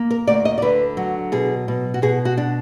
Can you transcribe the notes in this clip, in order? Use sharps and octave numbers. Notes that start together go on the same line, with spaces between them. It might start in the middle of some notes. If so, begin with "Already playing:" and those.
Already playing: A#3
A#4
D2 D5
D#5
D5
D3 B4
F#3
B2 G#4
B2
F#4
B2 G#4
F#4
D4